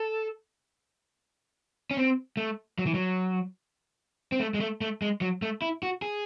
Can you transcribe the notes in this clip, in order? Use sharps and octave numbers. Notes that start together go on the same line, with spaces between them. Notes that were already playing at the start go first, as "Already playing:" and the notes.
Already playing: A4
C#4
C4
A3
F#3
E3
F#3
C4
A3
G#3
A3
A3
G#3
F#3
A3
E4
F#4
G#4